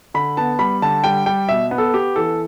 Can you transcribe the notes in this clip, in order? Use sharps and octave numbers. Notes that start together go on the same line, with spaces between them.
D3 B5
B3 A5
G3 B5
D3 A5
G3 G5
G3 G5
B2 E5
B3
A4
B3 G4
E3 A4